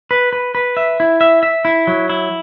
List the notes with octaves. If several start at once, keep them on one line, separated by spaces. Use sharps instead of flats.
B4
B4
B4
E5
E4
E5
E5
E4
F#3
E4